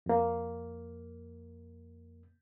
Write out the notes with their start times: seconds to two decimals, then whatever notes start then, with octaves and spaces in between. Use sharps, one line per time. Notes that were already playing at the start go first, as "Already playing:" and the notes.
0.06 F2 A#3